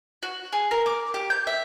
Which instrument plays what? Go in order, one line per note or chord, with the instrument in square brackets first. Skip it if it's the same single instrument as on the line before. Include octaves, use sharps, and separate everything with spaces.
[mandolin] F#4
G#4
A#4
D6
G4
G6
E5